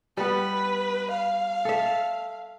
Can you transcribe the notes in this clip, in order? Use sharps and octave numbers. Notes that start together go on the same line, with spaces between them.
G3 B3 B4
F5
A4 E5